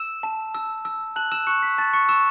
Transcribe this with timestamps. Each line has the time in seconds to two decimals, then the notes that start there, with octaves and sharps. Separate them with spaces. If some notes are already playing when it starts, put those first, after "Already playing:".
Already playing: E6 E7
0.23 A5
0.55 E6
0.85 E6
1.16 A5 F#6 F#7
1.32 E6 E7
1.47 C#6 F#6 C#7
1.63 B6
1.78 A5 A6
1.93 C#6 C#7
2.09 C#6 E6 E7